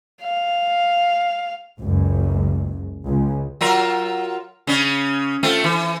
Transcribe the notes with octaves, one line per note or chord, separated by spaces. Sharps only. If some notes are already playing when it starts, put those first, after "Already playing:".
F5
F#1 C#2 F#2
C#2
F#3 F4 A#4
C#3 C#4
A3 C4 F4
E3